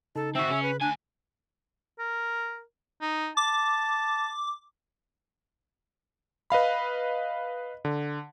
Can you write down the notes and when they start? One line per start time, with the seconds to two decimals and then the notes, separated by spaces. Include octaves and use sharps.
0.16 C#3 D#4 A4 A5
0.35 C4 F#4 E5
0.50 C#3 C#4
0.63 B4
0.81 D2 D4 G#5
1.99 A#4
3.02 D#4
3.37 A5 D6
6.50 B4 D#5 F5 B5
7.85 D3